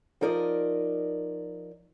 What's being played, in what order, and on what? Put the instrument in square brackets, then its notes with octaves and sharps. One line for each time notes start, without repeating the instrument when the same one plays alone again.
[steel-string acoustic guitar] F3 D#4 A#4 D5 D#5